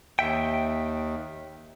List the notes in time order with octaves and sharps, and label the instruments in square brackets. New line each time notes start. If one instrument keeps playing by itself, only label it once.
[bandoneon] D#2 [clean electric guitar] E5 G5